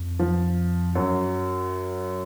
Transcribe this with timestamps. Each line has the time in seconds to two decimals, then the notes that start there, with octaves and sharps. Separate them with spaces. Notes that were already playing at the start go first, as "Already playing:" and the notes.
Already playing: F2
0.19 F3
0.95 F#2 F#3